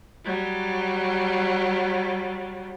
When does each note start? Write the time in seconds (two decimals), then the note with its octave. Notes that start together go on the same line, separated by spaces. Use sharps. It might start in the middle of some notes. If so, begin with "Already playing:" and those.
0.25 F#3 G3